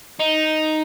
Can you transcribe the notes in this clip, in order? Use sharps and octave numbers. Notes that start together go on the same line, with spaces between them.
D#4